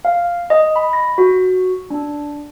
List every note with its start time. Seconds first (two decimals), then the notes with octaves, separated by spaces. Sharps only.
0.05 F5
0.50 D#5
0.76 B5
0.93 A#6
1.18 F#4
1.90 D4